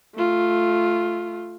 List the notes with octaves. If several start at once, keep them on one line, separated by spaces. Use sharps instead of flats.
A3 F4